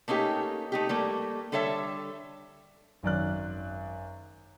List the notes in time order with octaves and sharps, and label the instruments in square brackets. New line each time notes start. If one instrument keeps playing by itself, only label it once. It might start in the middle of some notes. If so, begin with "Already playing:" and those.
[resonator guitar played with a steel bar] A3 A#3 C#4 D#4 G4
A3 D#4 G4
G3 A3 A#3
D3 G3 A4 C#5 E5
[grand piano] G#1 F#2 D5 F#6